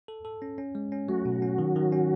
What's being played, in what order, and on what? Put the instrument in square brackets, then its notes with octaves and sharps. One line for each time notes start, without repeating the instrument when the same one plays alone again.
[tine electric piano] A4
A4
C#4
C#4
G#3
C#4
[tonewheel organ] F#3 F#4 [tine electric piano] A3
[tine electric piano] B2
C#4
D#3
D#3
C#4